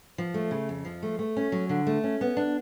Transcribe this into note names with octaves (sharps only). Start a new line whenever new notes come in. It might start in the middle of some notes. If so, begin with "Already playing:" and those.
F3
A3
C#3
F2
F3
A3
A3
C#4
F#3
D3
A3
C#4
B3
D4